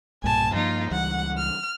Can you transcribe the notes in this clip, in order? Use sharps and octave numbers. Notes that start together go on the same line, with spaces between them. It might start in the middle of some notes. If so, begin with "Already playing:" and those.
B1 G2 A#2 G#5 A5
G2 F3 A#3 D#4 F4
C#2 E3 G3 F#5
F6